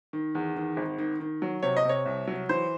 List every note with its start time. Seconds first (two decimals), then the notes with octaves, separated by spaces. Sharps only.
0.13 D#3
0.35 E2
0.56 D#3
0.77 G#1
0.98 D#3
1.20 D#3
1.42 F#3
1.63 C3 C#5
1.77 D#5
1.85 C3 C#5
2.06 C2
2.27 F#3
2.49 E3 C5